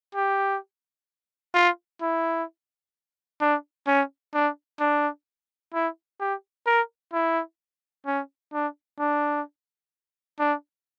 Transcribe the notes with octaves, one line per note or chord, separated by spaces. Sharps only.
G4
F4
E4
D4
C#4
D4
D4
E4
G4
A#4
E4
C#4
D4
D4
D4